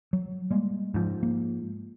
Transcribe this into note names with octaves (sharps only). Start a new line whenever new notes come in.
F#3
G3 G#3 A#3
G#2 F3
A#3